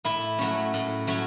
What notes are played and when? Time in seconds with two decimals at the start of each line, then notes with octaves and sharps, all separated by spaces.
0.05 A2 E4
0.38 F#3 A3 C#4
0.74 A2
1.07 F#3 A3 C#4